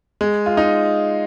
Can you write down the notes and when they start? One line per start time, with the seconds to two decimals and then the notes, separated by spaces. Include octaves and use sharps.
0.21 G#3
0.46 F4
0.57 D#4